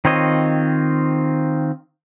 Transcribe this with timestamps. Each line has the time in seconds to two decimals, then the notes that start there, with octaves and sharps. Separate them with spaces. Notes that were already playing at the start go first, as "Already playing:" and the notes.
0.05 D#3 C4 F4 C#5 D#5